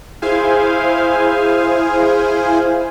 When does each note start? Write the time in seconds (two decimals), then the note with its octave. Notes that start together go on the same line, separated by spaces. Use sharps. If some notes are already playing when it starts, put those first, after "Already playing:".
0.22 E4 G#4 C5 F5 G#5